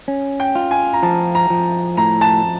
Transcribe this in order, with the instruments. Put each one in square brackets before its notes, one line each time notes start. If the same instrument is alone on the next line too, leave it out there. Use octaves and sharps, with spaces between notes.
[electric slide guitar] C#4
[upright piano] G5
[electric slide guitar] F4
[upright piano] G#5
A#5
[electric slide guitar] F3 [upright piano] A5
[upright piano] A#5
[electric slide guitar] F3
[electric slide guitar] A2 [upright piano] A#5
[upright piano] A5